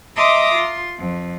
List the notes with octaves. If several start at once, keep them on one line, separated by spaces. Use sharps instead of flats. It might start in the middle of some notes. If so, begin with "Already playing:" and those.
D#5 E5 A#5 C6 D6 D#6
F4 C6
F2